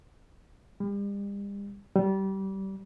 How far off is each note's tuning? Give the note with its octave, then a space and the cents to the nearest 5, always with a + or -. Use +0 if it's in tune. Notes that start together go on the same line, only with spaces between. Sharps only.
G3 +40
G3 -25